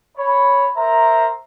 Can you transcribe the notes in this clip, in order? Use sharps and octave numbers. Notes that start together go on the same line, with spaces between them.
C#5 B5
A#4 C5 E5 A#5 C6